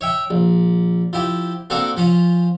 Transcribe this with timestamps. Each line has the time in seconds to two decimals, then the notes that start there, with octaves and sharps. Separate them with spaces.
0.01 C#5 E5 G5
0.30 A#1
1.13 F3 E4 G4
1.70 A#3 C4 D4 F#4 A4 A#4
1.97 F3 C#4 F4